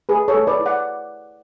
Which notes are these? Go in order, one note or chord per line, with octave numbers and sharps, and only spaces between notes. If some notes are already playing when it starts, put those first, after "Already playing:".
A3 G#4 B4
A4 C#5
A3
B4 D5
E4
D5 F#5